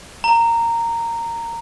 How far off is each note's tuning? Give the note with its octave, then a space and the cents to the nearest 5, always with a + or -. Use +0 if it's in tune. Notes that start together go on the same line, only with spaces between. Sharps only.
A#5 -10